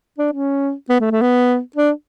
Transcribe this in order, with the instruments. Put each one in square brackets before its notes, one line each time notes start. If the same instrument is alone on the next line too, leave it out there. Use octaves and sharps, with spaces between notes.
[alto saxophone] D4
C#4
B3
A3
A3
B3
D4